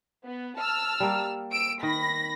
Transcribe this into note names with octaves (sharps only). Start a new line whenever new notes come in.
B3
A5 E6 F6
G3 A#3
E6 D7
D#3 B5 A#6